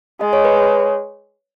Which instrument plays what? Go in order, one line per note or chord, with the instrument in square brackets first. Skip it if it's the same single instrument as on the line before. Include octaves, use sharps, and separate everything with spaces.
[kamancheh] G#3 [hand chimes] D#5
[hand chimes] C#5
B4
C#5